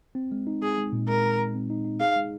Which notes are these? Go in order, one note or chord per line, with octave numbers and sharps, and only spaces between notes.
C4
G#3
D#4
G#3 G#4
G#3
A#2
G#3 A#4
G#3
G#3
C4
D#4
D#4
G#4 F5
G#3